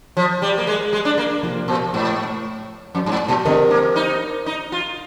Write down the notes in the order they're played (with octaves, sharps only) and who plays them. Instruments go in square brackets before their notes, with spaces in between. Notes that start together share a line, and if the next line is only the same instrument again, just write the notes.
[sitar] F3
G3
A#3
G#3
G#3
D4
A#3
[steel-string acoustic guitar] C3 F3 A#3 F4
[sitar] A#2
G#2
F2
G2
G#2
A#2
[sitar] D3 [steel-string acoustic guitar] F3 C4 G4 A#4 D#5
[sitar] A#3
D#4
D#4
F4